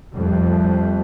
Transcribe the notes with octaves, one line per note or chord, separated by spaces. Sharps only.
F2 G3 A3